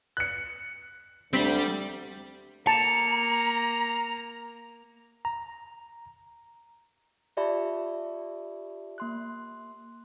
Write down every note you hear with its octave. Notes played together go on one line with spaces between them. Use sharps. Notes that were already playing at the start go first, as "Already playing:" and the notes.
F#6 C#7
D2 G3 C4 B6
A#3 A5 A#5 C#7
A#5
F4 G4 D5 E5 A5 B5
A#3 C6 F#6